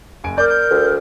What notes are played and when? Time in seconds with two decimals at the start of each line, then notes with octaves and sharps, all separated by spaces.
0.24 F#1 G#5 D7
0.38 A#4 D5 D6 G6
0.49 G6
0.71 D2